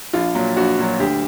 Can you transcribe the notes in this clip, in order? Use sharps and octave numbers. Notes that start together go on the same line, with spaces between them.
A#1 F4
A#2 F#3
A#1 F#4
A#2 F#3
D2 G4